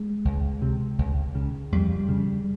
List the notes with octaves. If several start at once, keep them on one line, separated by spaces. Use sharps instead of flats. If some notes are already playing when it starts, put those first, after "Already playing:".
Already playing: G#3
C#2
C3
C#2
C#3
F2 G3
C#3